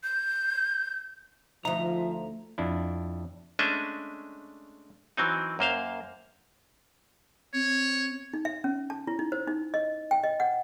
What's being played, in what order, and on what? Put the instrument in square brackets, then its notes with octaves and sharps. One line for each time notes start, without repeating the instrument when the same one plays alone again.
[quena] G6
[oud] D2 D#4 [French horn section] F3 [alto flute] E5 [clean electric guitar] A#5
[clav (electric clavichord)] F2 D4 E4
G#3 A3 C#4 D4 D#5 E5
E3 F#3 C4 D#4
F#2 A#3 C5 F5
[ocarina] C4 [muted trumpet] C#5
[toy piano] D#4
E5
C#4
A5
E4
D#4
C5
D#4
D#5
G5
D#5
F#5